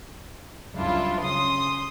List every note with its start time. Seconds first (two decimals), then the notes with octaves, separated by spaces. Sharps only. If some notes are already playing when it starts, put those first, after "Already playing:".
0.74 C#2 F#2 G3 D4 E4 F4
1.18 C#3 C6 D#6